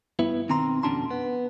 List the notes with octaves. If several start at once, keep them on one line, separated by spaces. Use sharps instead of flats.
G2 B3 E4
B1 D#3 C4 A#5 C6
F2 B2 C#4 D4 A5 C6
B3